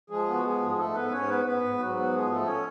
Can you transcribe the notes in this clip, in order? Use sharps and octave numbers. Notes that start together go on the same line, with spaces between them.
F3 G#3 G#4
B3
F#4
F3 G#3 G#4
G#2
G#4
G#2 A3 A4
G#2 B3 B4
G#2 C#4 C#5
B3 B4
G#2 B3 B4
G#2
G#2 F#3 F#4
B3
F3 G#3 G#4
G#2 A3 A4
C#4 C#5